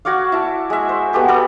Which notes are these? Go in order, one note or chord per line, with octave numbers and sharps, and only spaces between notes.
F#4 C#5 D5 F5
E4 A5
G#3 E5
C5
B3 F#4 G4 A4
A4 B4 B5